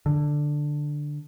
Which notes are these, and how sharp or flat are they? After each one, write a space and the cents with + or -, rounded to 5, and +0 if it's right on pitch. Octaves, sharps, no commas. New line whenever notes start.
D3 +5